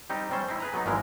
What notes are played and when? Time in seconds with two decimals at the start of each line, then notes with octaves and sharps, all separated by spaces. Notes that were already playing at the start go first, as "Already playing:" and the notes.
0.10 G3 C4 D#4 G4
0.31 G3 C4 C#4 C5
0.49 C4 D#4 E4
0.60 G#4 B4 A#5
0.74 F#3 B3 D#4
0.86 G#1 E3 F3 G#3 A#4